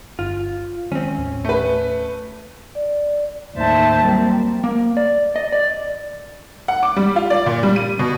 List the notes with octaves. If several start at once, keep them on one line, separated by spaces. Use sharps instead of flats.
G1 F4
D#3 F#3 G#3 C4 C#4
D#2 A2
A3 B4
D5
D#2 A2 D#3 C5 E5 A5
F#3 G3 A#3 C4
A#3
D5
D#5
D5
F#5
D6
G3
F4
D5
A#2
G3
D#7
B2